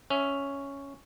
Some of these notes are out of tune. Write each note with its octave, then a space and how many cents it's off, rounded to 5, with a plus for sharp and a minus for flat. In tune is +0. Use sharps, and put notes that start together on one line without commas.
C#4 +0 E5 +0